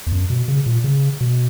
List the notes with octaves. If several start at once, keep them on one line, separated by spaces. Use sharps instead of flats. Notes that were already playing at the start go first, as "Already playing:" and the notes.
E2
F#2
B2
C#3
A#2
C#3
B2